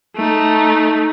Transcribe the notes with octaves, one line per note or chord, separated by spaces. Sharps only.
A3 D#4